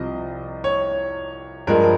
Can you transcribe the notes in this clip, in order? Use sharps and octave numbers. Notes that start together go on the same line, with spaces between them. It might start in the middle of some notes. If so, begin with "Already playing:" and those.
Already playing: C2 C3 F3 D#5
C#5
G2 F3 G#3 A#4